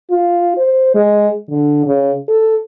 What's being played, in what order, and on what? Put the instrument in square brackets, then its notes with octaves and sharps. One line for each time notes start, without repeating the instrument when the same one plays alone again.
[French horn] F4
C5
G#3
D3
C#3
A4